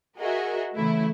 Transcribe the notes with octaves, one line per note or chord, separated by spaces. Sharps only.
F#4 G#4 A#4 D#5 E5
C#3 E3 A3 E4